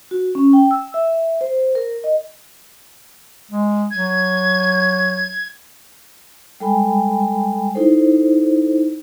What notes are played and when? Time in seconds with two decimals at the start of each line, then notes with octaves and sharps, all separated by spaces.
0.11 F#4
0.35 C#4
0.53 G5
0.71 E6
0.94 E5
1.41 C5
1.75 A#4
2.04 D#5
3.51 G#3
3.91 F#3 G#6
6.60 G3 G#3 A4 G5 G#5 B5
7.75 D#4 E4 A4 C5